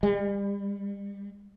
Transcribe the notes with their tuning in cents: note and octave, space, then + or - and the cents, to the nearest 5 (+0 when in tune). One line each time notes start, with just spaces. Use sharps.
G3 +35